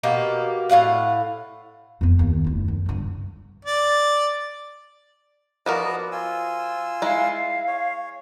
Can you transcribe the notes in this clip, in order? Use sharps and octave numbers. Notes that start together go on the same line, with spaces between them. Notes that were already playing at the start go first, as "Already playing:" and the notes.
B2 A#3 G4
A2 C#4 F5 F#5
F2 B3
D#2
F#1 D2
F#2
G2 D3
D5
F3 B3 F#4 A#4 D5 D#5
F4 G#5 E6
G#3 E4 F5
C#5